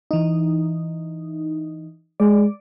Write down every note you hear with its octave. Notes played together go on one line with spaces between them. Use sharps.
E3 D#4
G#3 D5